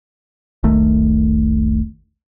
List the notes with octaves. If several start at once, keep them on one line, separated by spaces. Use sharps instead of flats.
E1 B1 D#3 A3